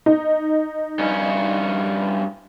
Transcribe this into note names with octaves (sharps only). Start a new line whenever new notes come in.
D#4
G2 C#4